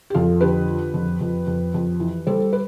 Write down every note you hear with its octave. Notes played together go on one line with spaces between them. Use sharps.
G4
F2 F4 A4
D3 G4 B4
F3
F2
F2
F2
F2
E3
G3 A4 C5
B4